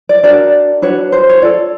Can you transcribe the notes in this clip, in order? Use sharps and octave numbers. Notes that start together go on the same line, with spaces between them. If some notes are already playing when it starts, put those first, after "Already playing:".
D5
D4 F#4 A#4 D5
D4 F#4 B4 C#5
C5
C#5
F4 A4 D5